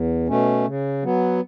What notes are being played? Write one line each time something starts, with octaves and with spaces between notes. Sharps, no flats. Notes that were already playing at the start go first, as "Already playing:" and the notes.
Already playing: E2
B2 A3 C#4
C#3
F#3 B3